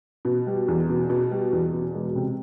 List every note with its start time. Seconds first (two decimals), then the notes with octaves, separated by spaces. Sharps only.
0.25 B2
0.47 G3
0.68 E2
0.89 B2
1.10 B2
1.31 G3
1.53 E2
1.73 B2
1.95 E1
2.15 C3